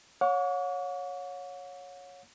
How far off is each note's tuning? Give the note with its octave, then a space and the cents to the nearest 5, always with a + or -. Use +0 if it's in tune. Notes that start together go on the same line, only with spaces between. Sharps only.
C#5 +0 F#5 -40 C#6 +45